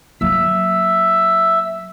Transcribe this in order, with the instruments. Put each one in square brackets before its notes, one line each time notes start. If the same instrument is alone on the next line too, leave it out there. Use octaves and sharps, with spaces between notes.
[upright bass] F#3 A#3 [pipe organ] E5 E6